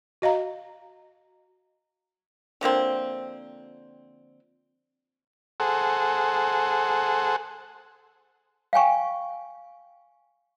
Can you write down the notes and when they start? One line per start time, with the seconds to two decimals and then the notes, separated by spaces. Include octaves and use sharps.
0.22 F#4 D#5 F5 A#5
2.61 D3 F3 A#3 C4
5.60 G#4 A4 C5 F#5
8.73 F5 G5 G#5 C#6